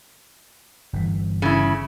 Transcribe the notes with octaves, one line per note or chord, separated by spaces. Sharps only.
G1 E3
C#3 E4